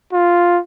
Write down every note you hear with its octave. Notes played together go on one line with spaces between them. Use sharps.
F4